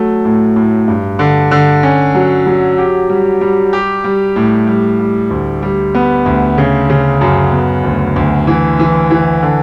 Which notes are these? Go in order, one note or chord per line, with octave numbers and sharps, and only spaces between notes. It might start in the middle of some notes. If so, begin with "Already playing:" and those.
Already playing: F#3 A3
A2
A2
G2
D3
D3
C#4
F#3
F#3
G4
G3
G3
G4
G3
A2
G3
G3
D2
G3
B3
D2
C#3
C#3
F#2
B3
D2
D2
E3
E3
E3
D3